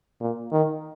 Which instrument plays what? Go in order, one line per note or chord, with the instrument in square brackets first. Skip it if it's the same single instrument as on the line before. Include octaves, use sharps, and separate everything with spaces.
[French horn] A#2
D#3